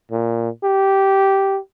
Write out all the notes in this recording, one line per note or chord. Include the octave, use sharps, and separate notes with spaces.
A#2
G4